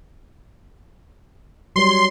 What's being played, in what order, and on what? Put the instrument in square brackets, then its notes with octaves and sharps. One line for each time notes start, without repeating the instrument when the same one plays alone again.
[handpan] F#3 G3 C#5 [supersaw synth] C6